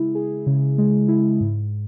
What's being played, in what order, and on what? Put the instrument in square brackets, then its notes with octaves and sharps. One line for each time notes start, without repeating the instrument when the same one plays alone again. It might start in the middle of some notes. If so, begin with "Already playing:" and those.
Already playing: [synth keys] C#3 G#3 E4 G#4
G#4
C#3
G#3
E4
G#2